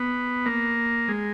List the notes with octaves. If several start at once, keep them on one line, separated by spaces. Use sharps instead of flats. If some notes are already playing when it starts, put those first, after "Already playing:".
Already playing: B3
A#3
G#3